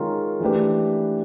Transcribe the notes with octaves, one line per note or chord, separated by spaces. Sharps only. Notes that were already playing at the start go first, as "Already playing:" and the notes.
Already playing: D#3 G#3 C#4 F4 A#4
E3 A3 D4 G4 B4